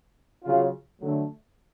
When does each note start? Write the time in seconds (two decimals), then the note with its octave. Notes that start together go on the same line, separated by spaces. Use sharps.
0.43 C#3 F#3 C#4 F4
1.00 D3 F#3 A3